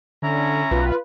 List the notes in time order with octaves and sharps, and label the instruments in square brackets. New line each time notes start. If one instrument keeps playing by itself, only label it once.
[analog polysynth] D3 [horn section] C#4 E4 A#5
[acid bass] B1 [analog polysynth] F4 B4